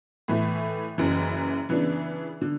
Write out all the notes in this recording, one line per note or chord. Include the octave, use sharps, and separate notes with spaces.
A2 E3 A3
F#1 F#2 C#3 E3
C#3 E3 B3 D4
D3